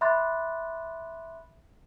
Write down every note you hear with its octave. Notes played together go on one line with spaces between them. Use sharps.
E5 B5 C6 D6 F#6 A6